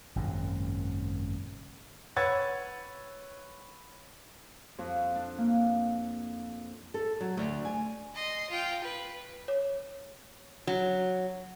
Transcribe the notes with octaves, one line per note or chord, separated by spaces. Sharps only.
G#1 F#2 A#2 C#3
B4 C#5 F#5 E6 G#6 A6
F2
D4
A#3
A4
F#3
D2
G#5
D#5 C6
F4 G5
B4
C#5
F#3